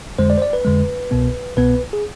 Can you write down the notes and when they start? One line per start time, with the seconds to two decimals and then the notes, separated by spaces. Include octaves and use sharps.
0.19 F2 D3 G#3 C5
0.30 D5
0.38 C5
0.42 D5
0.53 B4
0.65 F2 D3 G#3
1.11 C2 B2 B3
1.57 C2 B2 B3 B4
1.93 G#4